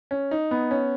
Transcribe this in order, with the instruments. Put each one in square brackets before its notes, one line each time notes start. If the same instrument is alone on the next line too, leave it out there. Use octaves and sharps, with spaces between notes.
[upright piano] C#4
D#4
B3
C#4